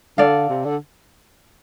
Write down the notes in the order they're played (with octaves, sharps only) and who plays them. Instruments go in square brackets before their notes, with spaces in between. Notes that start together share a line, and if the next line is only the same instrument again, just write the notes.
[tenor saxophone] D3 [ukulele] A4 D5 F5
[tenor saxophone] C3
D3